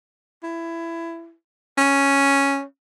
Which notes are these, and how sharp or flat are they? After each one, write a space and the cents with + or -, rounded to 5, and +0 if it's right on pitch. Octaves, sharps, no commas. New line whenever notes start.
E4 +20
C#4 +0